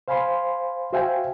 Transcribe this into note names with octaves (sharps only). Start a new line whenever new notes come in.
C5 F5 G#5 B5 C6
F#4 C5 E5 F5 G5 G#5